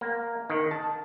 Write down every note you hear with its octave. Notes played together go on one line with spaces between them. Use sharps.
A#3
D#3
A5